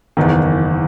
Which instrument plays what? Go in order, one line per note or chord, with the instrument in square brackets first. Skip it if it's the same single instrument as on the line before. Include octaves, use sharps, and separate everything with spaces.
[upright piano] F#1 E2 D#3